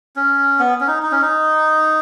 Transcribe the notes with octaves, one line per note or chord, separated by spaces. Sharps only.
C#4
B3
C#4
D#4
D#4
C#4
D#4